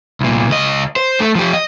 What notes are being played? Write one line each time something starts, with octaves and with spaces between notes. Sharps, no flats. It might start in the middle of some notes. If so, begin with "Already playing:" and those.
C2 A#2
C#2 D#5
C5
A3
F3 G4
D#5